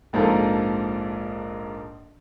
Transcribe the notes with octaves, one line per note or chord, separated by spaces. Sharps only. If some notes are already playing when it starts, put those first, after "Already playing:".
A#1 G#2 F3 A#3 A4 A#4